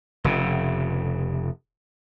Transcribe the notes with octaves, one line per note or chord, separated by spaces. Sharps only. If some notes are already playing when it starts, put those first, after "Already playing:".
F1 C#3